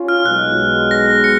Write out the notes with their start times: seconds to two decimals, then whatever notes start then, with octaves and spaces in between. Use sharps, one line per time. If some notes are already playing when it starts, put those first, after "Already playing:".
Already playing: C#4 F4
0.09 F6
0.25 B1 B2 G#3 F#6
0.91 A#6
1.24 C#7